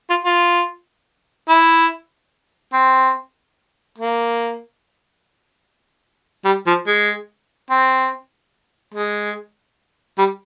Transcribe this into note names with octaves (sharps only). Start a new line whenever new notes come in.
F4
F4
E4
C4
A#3
G3
F3
G#3
C4
G#3
G3